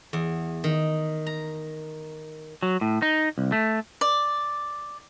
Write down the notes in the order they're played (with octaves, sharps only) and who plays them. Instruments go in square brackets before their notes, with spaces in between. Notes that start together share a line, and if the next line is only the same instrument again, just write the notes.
[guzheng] E2
D#3
A#5
[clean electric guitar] F#3
A2
D#4
C2
A3
[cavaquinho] D5